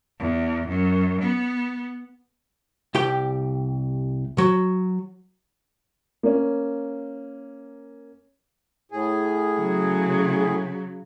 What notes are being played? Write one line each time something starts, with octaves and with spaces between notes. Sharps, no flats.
E2
F#2
B3
C2 G4 G5
F#3
A#3 C#4
A2 G#4
C#3 F#3